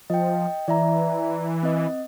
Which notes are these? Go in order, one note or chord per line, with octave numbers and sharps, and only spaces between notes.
F3 D#5 G5
E3 D5 E5 A#5
C4 D#5